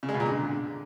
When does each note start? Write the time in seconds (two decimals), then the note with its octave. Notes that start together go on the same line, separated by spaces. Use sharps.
0.03 C#3
0.09 G#3
0.14 B2
0.20 A#2
0.26 D3